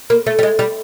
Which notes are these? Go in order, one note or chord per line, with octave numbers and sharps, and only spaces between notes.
A#3
A3
G3
G#3
G3